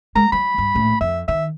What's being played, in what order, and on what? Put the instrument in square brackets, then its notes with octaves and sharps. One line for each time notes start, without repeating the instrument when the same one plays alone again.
[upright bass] G#3 [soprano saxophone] A#5
[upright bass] F#3 [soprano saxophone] B5
[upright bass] G2
A#1 A2
[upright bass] F2 [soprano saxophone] E5
[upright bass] D#3 [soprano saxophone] E5